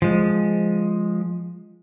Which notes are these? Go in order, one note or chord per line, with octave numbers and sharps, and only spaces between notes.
F3 G#3